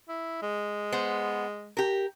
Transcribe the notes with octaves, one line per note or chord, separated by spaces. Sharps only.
E4
G#3
B3 C5
G4 A#4